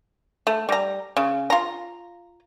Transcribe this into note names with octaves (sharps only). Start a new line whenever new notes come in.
A3
G3 A#5
C#3
F4 A#5